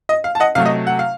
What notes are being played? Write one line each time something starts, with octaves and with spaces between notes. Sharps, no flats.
D#5
F5
A5
D#5 F#5
C3 F#3 A3 F5
D#5
F#5
F5